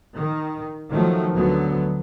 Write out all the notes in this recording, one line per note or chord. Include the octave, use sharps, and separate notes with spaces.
D#3
D#3 F3 F#3 A3
D2 D3 F#3 B3